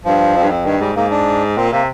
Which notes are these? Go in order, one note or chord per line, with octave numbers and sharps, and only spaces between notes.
G2 F3
F2
G2
F2
G2 D#3
G#2 G3
G#2 A#3
D4
A#2 C4
C3 A#3